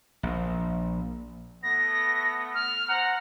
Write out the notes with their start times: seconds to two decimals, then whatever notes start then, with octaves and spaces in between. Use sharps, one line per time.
0.23 A#1
1.63 A3 B3 A#6
2.55 F6
2.88 C5 F#5 A#5